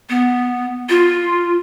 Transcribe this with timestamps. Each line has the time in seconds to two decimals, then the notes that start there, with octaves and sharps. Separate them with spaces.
0.09 B3
0.89 F4